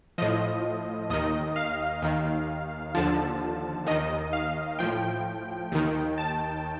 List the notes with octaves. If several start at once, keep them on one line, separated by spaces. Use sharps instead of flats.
A2 F3 D#5
D#2 D#3 D#5
F5
D#2 D#3
D#2 D3 F3 A5
D#2 D#3 D#5
F5
A2 F3 G5
D#2 D#3
A5